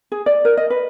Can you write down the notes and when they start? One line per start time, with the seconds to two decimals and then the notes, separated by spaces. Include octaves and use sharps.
0.12 G#4
0.26 D5
0.45 A#4
0.57 D#5
0.70 B4